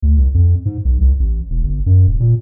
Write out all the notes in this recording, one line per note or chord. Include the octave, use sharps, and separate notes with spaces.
D2
C2
F2
G#2
B1
C2
A1
E1
G1
F#2
D#1
A#2